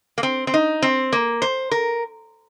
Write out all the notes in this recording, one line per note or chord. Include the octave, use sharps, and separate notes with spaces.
A#3
C4
C4
D#4
C4
A#3
C5
A#4